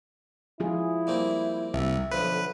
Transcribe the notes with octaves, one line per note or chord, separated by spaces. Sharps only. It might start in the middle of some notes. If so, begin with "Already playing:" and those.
F3 E4 F4 G#4
G3 A#3 C4
C2 E5
B1 D3 F3 B4